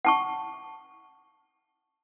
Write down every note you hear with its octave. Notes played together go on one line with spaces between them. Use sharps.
F#5 A5 C#6